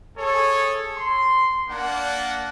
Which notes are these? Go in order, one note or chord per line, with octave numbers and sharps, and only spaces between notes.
G#4 A4 C#5
C6
A#3 D4 F#5